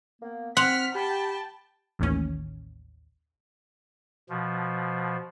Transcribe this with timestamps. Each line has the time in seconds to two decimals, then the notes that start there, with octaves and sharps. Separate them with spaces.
0.22 A#3 B3
0.57 C4 F#5 C6 F6 B6 F7
0.95 G4 G5 A5 B5
1.99 A1 D#2 C#4
4.29 B2 F3